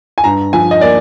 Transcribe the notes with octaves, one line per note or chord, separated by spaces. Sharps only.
G#5
G2 A#5
F3 G#5
D#5
A#3 D5